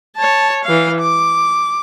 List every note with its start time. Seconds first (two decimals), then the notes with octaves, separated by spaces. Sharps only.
0.17 C#5 A5
0.65 E3 F5
1.01 D6